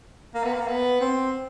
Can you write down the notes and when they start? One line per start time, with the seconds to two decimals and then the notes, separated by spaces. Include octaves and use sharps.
0.35 A#3
0.44 B3
0.54 A#3
0.68 B3
1.01 C4